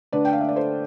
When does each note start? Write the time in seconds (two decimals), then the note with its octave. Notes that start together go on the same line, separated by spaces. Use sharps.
0.12 D3 A3 D4 B4 D5
0.25 G5
0.33 F5
0.41 E5
0.48 D5
0.56 A4 C5